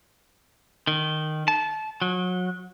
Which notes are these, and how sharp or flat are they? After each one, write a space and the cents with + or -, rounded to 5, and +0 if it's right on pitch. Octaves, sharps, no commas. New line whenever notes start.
D#3 -10
A5 -20
F#3 -30